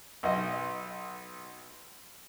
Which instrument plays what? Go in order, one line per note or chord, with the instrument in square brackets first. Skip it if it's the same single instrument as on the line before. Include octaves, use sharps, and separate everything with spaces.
[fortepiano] B1 D#5